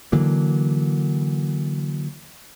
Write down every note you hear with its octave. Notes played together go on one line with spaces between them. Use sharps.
D3 E3 F#3 A#3